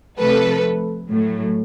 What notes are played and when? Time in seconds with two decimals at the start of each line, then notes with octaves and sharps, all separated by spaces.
0.19 C3 F3 A3 A4 B4
1.10 A2 F#3 A3